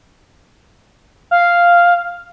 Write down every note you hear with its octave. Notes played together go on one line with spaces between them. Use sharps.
F5